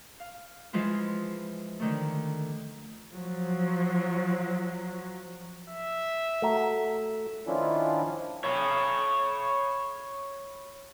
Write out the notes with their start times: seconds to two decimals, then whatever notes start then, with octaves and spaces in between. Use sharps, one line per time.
0.20 F5
0.73 E3 F3 G#3 E4 F4
1.80 D3 D#3 A3
3.15 F3 F#3
5.69 E5
6.42 A3 F#4 A#5
7.47 D#3 F3 C#4 D4 E4 F4
8.44 C#5 B5